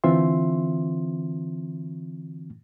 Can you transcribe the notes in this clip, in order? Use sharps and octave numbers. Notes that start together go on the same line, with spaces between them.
D3 E3 C4 F4 E5 C6